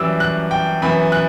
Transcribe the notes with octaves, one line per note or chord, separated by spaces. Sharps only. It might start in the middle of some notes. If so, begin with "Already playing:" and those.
Already playing: F#2 E3 G3 D6 E6
F#6
G5
F#2 E3 B3 B5
F#6